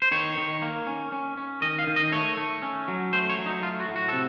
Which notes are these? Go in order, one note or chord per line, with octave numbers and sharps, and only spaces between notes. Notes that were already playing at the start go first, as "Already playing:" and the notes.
C5
D#3 C#5
D#3
A#3
C#4
C#4
C#4
D#3 D#5
F5
D#3
D#5
A3 C#5
A3
C#4
F#3
A3 C5
C#5
F#3
D#4
A3 F4
F#4
A2
F#4
C3 A4